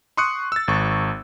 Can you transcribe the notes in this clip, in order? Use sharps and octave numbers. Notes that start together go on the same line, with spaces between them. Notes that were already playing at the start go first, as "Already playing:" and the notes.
C6 C#6 D#6 F#6 C#7
E6 A6
G#1 C#6